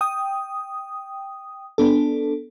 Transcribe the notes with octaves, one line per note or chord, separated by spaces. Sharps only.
G5 D#6
B3 D4 A4